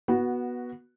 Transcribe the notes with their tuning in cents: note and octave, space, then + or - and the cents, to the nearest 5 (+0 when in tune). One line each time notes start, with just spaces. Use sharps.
B3 -15 F#4 +0